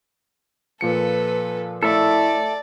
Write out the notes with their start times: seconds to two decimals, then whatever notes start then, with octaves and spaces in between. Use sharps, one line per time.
0.81 A#2 F3 A4 B4 C#7
1.83 A2 A4 D5 E5